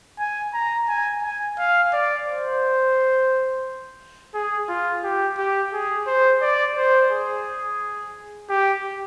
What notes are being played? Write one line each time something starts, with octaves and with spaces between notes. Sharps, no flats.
G#5
A#5
G#5
G#5
F5
D5
C5
G#4
F4
G4
G4
G#4
C5
D5
C5
G#4
G4